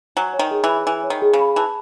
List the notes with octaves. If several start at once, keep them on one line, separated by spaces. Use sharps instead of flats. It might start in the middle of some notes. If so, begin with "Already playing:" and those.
F#3 G#5
C#5
D#3
G#4
E3
B5
E3 G#5
C#5
D#3
G#4
C#3
B5
E3 A5